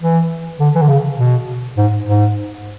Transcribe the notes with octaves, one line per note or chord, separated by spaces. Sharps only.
E3
D3
E3
D3
C#3
B2
G#2
G#2